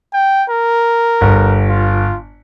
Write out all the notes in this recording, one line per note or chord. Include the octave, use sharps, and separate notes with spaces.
G5
A#4
G1
F4